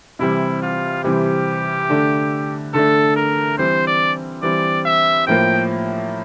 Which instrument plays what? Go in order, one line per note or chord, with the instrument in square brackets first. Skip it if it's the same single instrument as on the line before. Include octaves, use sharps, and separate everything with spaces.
[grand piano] C3 E3 G3 C4 [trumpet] E4
[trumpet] F4
[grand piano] C3 E3 G3 C4 [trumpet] G4
[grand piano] D3 A3 D4
[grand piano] D3 A3 D4 [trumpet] A4
[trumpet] A#4
[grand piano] E3 G3 C4 [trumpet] C5
[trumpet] D5
[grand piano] E3 G3 C4 [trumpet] D5
[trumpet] E5
[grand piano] A2 F3 A#3 [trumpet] G5